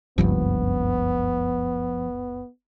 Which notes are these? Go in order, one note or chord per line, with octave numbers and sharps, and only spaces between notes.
F#1 C#2 G2 F3 B3